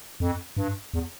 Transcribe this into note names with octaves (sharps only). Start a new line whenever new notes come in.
F2
G2
E2